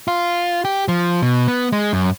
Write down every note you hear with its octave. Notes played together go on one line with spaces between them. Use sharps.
F4
G4
F3
B2
B3
G#3
F#2